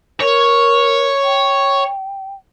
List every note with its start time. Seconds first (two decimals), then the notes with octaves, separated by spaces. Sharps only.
0.20 A#4 C#5
1.24 G5